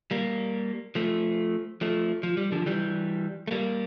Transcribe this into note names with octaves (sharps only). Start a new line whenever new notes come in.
G3 A#3
F3 A3
F3 A3
F3
G3
D3 F3
E3 G3
A3
G3 A#3